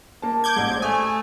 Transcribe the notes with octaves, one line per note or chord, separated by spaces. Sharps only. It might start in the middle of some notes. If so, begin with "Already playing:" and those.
A#3 A5
D6 G6 G#6
A1 G#2
C5 D5
A3 G#5 D#6